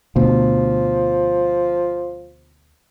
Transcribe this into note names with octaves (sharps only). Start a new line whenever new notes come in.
D2 B2 F3